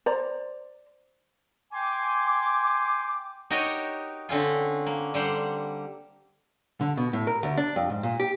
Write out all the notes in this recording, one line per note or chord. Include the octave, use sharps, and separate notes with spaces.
C5 D5 A#5
G5 G#5 C6 D6
D#4 F#4 G4 A#4 C#5 D#5
D3 C4 C#4 F4
A#3
D3 G3 C5 F#5
D3
B2
A2
A#4
D2
D4
F2
G#2
A#2
G4